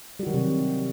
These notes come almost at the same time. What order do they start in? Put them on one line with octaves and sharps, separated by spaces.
G3 F#4 D#3 F#3 C3